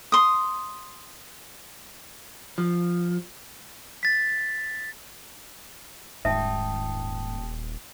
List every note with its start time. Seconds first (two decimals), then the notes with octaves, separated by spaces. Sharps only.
0.12 C6 D#6
2.58 F3
4.03 A6 B6
6.25 D#1 G#2 E5 G5 A5 D#6